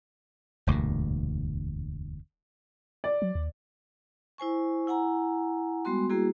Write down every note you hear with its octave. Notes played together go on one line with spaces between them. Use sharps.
E1 D2 G2 A#2
D5
F#3
D#2
E4 C5 G#5 C#6
E4 F#5 G#5 A#5
G3 G#3 B3 F#4 C6
G3 A#3 E4 F#4 G#4